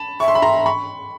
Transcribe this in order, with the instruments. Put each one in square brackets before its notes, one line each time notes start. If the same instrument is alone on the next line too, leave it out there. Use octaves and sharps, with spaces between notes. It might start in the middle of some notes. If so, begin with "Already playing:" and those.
Already playing: [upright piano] A5 B5
[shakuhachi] E5 [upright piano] C#6
[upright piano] C6
B5
A#5 C6
B5 C#6